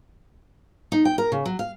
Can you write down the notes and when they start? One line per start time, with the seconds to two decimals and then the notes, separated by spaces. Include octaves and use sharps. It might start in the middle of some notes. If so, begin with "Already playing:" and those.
0.92 D#4
1.05 G5
1.18 A#4
1.32 C#3
1.46 F#3
1.59 F5